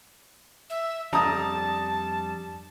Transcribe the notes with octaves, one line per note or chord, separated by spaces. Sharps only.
E5
F2 G3 D4 A5 A#5 D#6